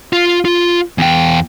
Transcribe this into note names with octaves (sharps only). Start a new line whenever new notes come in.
F4
F4
E2 G5